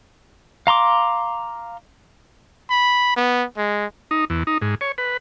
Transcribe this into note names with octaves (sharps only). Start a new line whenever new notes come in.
F5 A#5 C6 D6
B5
B3
G#3
D#4
E2
D#4
G#2
C#5
B4